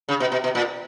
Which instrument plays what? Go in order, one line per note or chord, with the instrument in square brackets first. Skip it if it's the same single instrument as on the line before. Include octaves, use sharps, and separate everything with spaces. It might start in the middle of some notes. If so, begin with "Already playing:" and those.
[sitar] C#3
B2
B2
B2
A#2